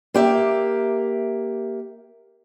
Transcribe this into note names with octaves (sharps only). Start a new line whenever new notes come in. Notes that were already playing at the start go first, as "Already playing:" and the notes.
A#3 G4 E5